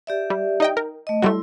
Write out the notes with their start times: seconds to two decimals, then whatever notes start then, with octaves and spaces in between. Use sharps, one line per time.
0.07 G4 D5 E5
0.30 G3
0.60 D#4 D#5 G5
0.77 A#4
1.07 A3 D#5
1.22 F#3 G3 A3 E4 C6